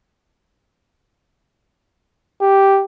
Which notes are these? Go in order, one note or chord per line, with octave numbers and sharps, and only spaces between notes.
G4